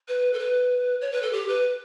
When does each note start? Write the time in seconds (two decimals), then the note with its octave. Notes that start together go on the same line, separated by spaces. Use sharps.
0.08 B4
0.33 A4
0.39 B4
1.01 C#5
1.12 B4
1.22 A4
1.32 G4
1.48 B4